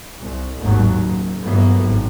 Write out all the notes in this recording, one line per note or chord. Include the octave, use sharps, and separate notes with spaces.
C2
G#1 D#2 A2 D#3 F#3
F#1
G1 E3 F#3 A#3 B3
G#1 A2